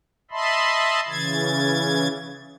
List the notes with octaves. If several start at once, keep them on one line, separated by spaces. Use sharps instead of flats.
D#5 E5 A5 B5 C6
C#3 E3 G#6 A6